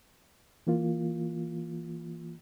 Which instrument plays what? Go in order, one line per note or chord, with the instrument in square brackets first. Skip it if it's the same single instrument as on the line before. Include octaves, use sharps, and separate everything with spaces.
[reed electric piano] E3 A#3 F4